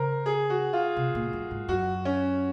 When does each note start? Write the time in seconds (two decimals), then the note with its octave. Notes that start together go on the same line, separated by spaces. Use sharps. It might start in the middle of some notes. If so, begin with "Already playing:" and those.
Already playing: C#3 A#4 C5
0.26 G#4
0.50 F#4
0.73 F4
0.97 C3
1.15 A#2
1.33 F#2
1.51 G#2
1.68 F#2 F#4
2.05 C#4